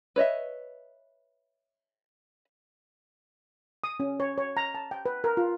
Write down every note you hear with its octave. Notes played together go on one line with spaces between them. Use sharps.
B4 C#5 D#5 E5
D#6
C#4
C#5
C#5
A#5
A5
G5
B4
A#4
F4